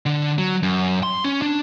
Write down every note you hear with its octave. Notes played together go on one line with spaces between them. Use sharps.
D3
F#3
F#2
C6
C#4
D4